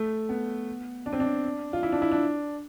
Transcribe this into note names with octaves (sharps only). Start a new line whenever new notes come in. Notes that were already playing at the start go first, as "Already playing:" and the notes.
Already playing: A3
B3
D4
C4
D4
F4
E4
D4
E4
D4